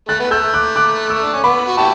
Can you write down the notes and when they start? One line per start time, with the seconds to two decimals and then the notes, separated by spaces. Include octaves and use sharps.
0.09 A3 F#6 A6
0.20 B3
0.31 A3 E6 G6
0.54 D6 F#6
0.76 D6 F#6
1.10 C#6 E6
1.23 D4
1.33 C#4
1.44 B3 B5 D6
1.68 F#4
1.77 E4 G4 A5 C#6